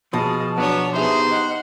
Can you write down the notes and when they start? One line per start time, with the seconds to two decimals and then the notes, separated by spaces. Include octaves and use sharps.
0.13 B2 F3 G#4 D#5 A5
0.56 F#3 B3 D4 C#5
0.95 B3 D#4 G4 G#4 C5 E5
1.31 D#5 F#5